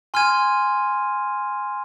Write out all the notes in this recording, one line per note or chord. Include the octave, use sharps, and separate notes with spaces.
G#5 C6 F6 G#6 D#7